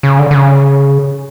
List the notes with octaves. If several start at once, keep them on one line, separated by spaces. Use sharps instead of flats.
C#3
D3
D3
C#3